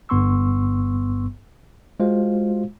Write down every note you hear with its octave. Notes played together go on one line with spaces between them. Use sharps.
G1 G2 B3 C6 C#6 E6
G#3 F4 F#4 C5 F5